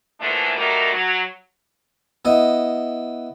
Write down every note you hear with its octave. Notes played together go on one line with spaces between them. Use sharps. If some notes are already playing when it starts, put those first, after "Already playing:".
A#2 D3 E3 F3 A3 D4
F#3 G3 A3 D#4 A#4 D5
F#3
B3 E4 D#5